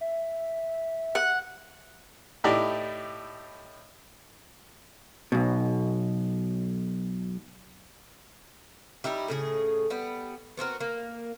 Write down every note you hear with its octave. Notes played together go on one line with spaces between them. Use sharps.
E5
F#5
A2 D#4 E4 G4 D5 D#5
B1 B2
G3 D#4 E4 G4
A2 C#3 G#4
G3 B3
B3 C4 F#4 A#4
A#3